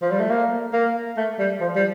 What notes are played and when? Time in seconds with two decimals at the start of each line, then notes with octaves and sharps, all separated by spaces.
0.02 F3
0.11 G3
0.20 A3
0.30 A#3
0.73 A#3
1.17 A3
1.39 G3
1.61 F3
1.76 G3